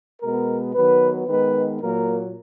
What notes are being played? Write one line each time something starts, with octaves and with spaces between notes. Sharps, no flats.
B2 G#3 B3 A#4
D#3 F#3 B3 B4
D#3 G#3 B3 B4
A#2 F#3 A#3 A#4